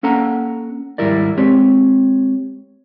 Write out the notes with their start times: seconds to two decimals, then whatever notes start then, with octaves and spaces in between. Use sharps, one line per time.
0.03 A#3 C#4 A4 F#5 A#5
0.98 D#2 G#2 G3 E4 A#4 D5
1.38 G#3 C4 G4 C#5